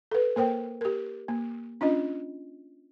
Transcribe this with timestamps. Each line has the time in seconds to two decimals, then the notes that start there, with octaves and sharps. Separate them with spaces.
0.11 A4 B4
0.36 A#3 A#4 C5 G5
0.81 G4 A#4
1.28 A#3
1.81 C#4 D4 F4 D#5